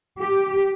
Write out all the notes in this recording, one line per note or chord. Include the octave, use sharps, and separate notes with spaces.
G4